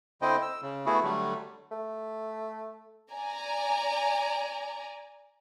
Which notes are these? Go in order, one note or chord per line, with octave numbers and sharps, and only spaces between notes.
D3 C4 E4 C5 D#5 G5
E6
C#3
A3 B3 E4 F#4 G#4
D3 F#3 G3 A3
A3
D5 G#5 A#5